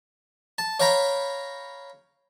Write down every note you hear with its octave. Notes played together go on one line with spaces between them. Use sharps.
A5
C#5 F5 G5 A#5 B5